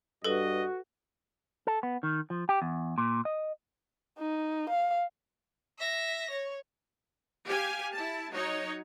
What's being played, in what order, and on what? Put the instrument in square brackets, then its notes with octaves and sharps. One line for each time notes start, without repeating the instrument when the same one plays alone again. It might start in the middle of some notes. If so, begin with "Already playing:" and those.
[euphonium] G2 [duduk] F#4 [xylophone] A4 B4 [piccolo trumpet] D#5
[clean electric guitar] A4
B3
D#3
F3
G4
E2
A#2
D#5
[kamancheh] D#4
F5
[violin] E5 A#6
C#5
[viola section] G4 F5 G#5
E4 A5
F#3 D#4 C#5